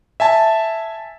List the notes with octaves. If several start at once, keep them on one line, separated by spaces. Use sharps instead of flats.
E5 G#5 A5